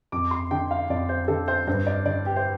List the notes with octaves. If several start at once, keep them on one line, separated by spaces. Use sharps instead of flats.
F2 D6
C6
D3 G5
F5
F2 D5
C5
D3 A4
C5
G2 C5
D5
D3 D5
G4
C5